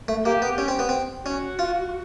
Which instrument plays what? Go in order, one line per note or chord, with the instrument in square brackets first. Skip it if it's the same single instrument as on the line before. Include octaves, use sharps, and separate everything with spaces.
[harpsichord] A3
[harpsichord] A#3 [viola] G4
[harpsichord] B3
C#4
C4
B3
C4
[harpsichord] C#4 [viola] F#4
[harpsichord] F4